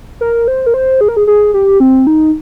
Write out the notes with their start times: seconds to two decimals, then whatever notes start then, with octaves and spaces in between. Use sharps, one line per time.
0.21 A#4
0.48 C5
0.66 A#4
0.74 C5
1.01 G#4
1.08 A#4
1.17 G#4
1.27 G#4
1.54 G4
1.80 C4
2.07 D#4